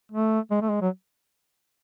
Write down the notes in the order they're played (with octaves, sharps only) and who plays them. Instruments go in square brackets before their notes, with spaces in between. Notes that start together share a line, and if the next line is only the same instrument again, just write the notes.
[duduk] A3
G#3
A3
G#3
F#3